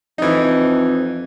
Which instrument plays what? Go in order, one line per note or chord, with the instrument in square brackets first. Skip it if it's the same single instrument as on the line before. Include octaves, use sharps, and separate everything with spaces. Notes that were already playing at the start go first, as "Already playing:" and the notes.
[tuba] F2 [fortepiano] E3 D#4